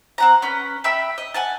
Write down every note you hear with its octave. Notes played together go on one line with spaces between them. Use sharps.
C4 F#5 A#5
C#4 B4
E5 G5 B5 E6
D#5
F#5 G#5 A5